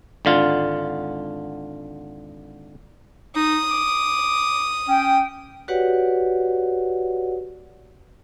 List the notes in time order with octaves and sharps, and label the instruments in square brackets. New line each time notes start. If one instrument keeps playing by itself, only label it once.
[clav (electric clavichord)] G#1 D3 F4
[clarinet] D#4 [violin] D#6
[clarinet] D6
[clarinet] C#4 [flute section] G5
[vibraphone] F#4 G4 B4 C#5 D5 F#5